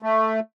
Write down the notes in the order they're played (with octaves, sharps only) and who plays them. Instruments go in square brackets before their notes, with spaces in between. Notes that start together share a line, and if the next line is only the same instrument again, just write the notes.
[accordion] A3